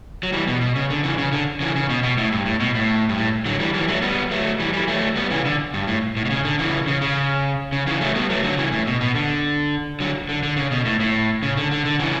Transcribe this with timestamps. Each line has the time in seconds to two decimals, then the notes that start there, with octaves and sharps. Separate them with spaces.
0.23 F#3
0.33 E3 G3
0.47 B2
0.61 B2
0.76 C#3
0.90 D3
1.04 C#3 E3
1.18 C#3
1.33 D3
1.60 C#3 E3
1.76 C#3
1.89 B2
2.03 B2
2.18 A2
2.32 G2
2.46 A2
2.60 B2
2.75 A2
3.09 G2
3.18 A2
3.46 D3 F#3
3.60 E3 G3
3.74 E3 G3
3.88 F#3 A3
4.02 G3 B3
4.31 F#3 A3
4.60 E3 G3
4.73 E3 G3
4.88 F#3 A3
5.16 G3 B3
5.30 C#3 E3
5.45 D3
5.74 G2
5.87 A2
6.17 A2
6.25 B2
6.30 C#3
6.45 D3
6.59 C#3 E3
6.87 C#3
7.02 C#3
7.72 C#3
7.87 C#3 E3
8.01 F#3 A3
8.15 G3 B3
8.30 F#3 A3
8.43 D3 F#3
8.58 C#3 E3
8.72 A2
8.87 B2
9.01 B2
9.15 D3
10.00 D3 F#3
10.29 D3
10.43 D3
10.57 C#3
10.71 B2
10.85 A2
11.00 A2
11.43 C#3
11.57 D3
11.71 D3
11.85 D3
11.99 C#3 E3